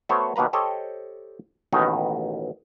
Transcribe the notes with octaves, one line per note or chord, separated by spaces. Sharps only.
A3 B3 F#4 C5 C#5
D#2 B2 A#3 B4 A#5
G4 A4 C5 C#5 D#5
A1 D#2 B2 D#3 D#4 B4